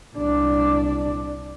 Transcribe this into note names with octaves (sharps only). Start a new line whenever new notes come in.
C2 D4